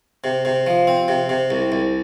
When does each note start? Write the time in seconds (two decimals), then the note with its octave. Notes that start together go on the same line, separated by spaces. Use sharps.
0.24 C3
0.45 C3
0.67 F3
0.87 C4
1.08 C3
1.29 C3
1.50 C2
1.72 C2